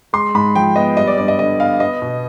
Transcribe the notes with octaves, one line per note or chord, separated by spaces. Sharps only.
G#3 C6
G#2 B5
F3 G5
B3 D#5
G3 D#5
D5
G2 D5
D#5
D3 D#5
B3 F5
B3 D#5
B2